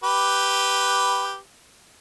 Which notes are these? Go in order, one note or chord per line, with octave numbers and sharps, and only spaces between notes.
G4 B4